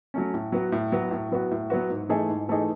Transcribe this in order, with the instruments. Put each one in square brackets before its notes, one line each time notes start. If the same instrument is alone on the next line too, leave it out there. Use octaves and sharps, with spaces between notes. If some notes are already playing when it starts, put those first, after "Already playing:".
[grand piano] F#3 A3 C#4
A2
F#3 B3 F#4
A2
F#3 B3 F#4
A2
F#3 B3 F#4
A2
F#3 B3 F#4
G#2
E3 A3 D#4 G#4
G#2
E3 A3 D#4 G#4